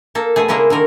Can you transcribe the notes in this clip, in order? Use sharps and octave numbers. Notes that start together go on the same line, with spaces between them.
A#3 A4
B2 A3 G#4
C#3 G#3 A#3 E4 G#4
D3 D#3 A#4